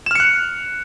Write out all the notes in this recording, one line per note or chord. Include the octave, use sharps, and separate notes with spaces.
F6 F#6 C#7 E7